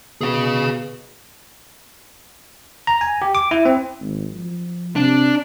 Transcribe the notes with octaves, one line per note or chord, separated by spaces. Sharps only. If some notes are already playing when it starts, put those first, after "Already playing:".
B2 G#4 F5
A#5
G#5
G4
D6
E4
C4
G#1
F3
C3 D4